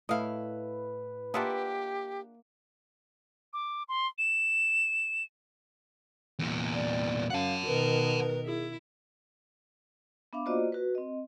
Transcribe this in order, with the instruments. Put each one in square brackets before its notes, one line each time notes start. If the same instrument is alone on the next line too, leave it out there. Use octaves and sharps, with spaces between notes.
[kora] A2 E4 [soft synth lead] B4 [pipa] D#5 F5
[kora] A#3 E5 F#5 [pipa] D4 F4 G#4 [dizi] G4
[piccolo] D6
C6
E7
[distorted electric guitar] E2 A#2
[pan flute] D5
[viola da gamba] F#2 [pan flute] F5 [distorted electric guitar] F#5 A5
[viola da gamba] B2 D#3 A#4 [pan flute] B4
[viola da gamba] E4 [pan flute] G#4
[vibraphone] B3 D4 E5 F5 D6
A#3 F4 F#4 C5 D5 D#5
F#4 B4
C4 D#5